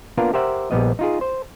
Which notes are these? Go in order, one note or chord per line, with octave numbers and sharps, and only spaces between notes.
A#3 B3 D4 F4 A#4
G4 A#4 C5 E5 F#5
A#1 G3 B3 D#5
D#4 F4 G#4
C5